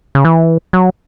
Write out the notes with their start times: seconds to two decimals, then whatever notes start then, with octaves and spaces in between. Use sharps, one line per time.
0.15 C#3
0.25 E3
0.73 F#3